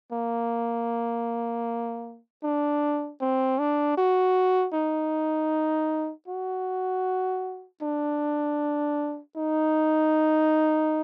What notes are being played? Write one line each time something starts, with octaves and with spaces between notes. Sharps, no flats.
A#3
D4
C4
D4
F#4
D#4
F#4
D4
D#4